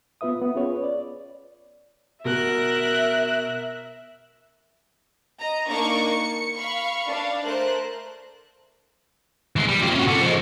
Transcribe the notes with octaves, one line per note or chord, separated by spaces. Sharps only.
B3 F4 B4 E5 D#6
B3
C#4 F4 G#4 B4 C#5
D5
B2 A#4 E5 F#6
D#5 A#5
A#3 D4 D#4 C#6 D6
C#7
F5 B5 C#6
D4 F5
A3 A#4 C5 F#6
E3 G#3
G3
A#2 C4
C#4 F#4
A#2 A3
F3 G#3